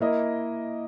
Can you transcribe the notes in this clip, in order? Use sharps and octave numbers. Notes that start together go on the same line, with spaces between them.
A#3 E4 A#4 D#5